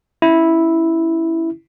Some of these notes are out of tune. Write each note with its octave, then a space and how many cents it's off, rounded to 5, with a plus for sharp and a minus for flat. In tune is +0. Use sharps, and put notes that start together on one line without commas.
C#4 +0 E4 -5